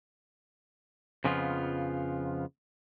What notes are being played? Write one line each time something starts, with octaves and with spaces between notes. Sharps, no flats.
F2 C#3 F3 B3 F4